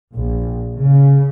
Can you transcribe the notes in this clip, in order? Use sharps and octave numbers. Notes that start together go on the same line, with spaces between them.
A#1
C#3